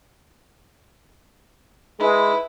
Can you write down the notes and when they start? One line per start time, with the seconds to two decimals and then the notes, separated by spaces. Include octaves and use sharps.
1.99 G#3 E4 B4